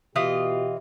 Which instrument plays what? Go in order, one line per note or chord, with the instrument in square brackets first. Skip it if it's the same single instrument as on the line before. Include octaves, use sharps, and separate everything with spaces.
[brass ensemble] B2 G4 [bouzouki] E3 F4 D#5